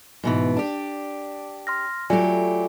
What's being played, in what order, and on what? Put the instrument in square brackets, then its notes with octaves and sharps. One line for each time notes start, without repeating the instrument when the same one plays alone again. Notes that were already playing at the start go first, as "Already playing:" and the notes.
[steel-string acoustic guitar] G#2 B2 E3
D4 G4
[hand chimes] C6 F6 A#6
[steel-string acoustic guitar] F#3 A3 G4 [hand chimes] F4 D5 G#5